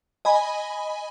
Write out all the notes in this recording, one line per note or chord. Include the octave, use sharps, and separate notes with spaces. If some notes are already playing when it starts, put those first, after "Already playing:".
D#5 G#5 B5